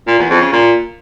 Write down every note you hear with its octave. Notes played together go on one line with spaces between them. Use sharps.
A#2
E2
F2
C#3
A#2